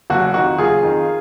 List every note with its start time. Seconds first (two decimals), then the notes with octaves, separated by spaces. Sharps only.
0.10 F#1 F#4
0.34 F2 D#3 F#4
0.58 F#1 F4 G#4
0.83 F2 D#3